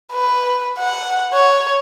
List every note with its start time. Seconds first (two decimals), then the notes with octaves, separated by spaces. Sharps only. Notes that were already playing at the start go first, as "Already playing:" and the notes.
0.12 B4
0.79 F#5
1.33 C#5